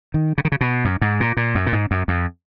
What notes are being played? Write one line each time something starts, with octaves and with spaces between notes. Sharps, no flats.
D#3
C#3
D#3
C#3
B2
F#2
G#2
A#2
A#2
F#2
A#2
G#2
F#2
F2